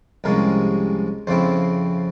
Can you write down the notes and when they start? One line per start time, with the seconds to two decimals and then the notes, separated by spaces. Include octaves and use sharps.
0.24 C2 C3 F3 G#3 C#4 A#4
1.27 F2 C#3 F3 C4 E4 C5